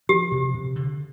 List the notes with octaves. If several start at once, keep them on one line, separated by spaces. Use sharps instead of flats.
F3 G4
C3
C3
D3